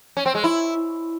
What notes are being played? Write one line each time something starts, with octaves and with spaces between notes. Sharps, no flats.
C#4
C4
G#3
E4